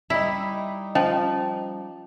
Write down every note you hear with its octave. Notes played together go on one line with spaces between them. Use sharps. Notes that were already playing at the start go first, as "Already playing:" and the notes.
G3 D#4 E4
F3 C#4 D#5